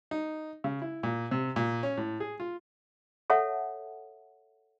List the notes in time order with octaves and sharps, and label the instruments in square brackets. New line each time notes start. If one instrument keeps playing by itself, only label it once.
[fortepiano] D#4
C#3
E4
A#2
C3
A#2
C#4
A2
G#4
F4
[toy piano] A4 C#5 E5 F#5 A5